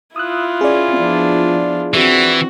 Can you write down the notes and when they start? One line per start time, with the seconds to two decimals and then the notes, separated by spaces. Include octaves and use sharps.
0.16 E4 F4 D#6 E6 F#6
0.61 C#4 G#4 D5
0.96 F3 B3 D4
1.94 E3 C4 F#4